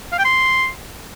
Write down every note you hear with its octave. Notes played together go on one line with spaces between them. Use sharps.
F5
G5
C6